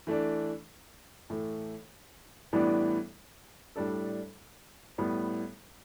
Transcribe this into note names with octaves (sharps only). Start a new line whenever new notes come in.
E3 A3 D4
A2 E3 A3
A2 E3 G3 B3 D4
A2 G3 D4 A4
A2 G3 B3